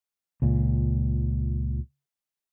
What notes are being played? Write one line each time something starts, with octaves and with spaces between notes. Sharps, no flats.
C#2 A#2